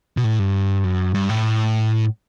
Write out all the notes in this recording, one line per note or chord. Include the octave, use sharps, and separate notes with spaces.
B2
A2
G2
F#2
G2
A2